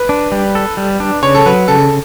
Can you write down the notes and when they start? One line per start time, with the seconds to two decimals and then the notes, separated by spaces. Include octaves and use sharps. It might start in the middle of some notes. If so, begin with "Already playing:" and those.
Already playing: B4
0.09 D4
0.32 G3
0.55 A4
0.77 G3
1.00 D4
1.22 C#3 C#5
1.35 A4
1.46 F#3 B4
1.68 C#3 A4